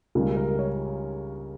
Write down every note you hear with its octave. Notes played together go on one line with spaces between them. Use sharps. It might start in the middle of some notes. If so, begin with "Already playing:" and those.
C#2 C#3 G3 A#3
A#4
C#5